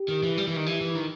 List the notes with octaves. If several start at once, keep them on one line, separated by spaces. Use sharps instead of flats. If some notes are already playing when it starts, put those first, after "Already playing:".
Already playing: G4
D#3
E3
G3 G4
E3
D#3
E3
E3
D#3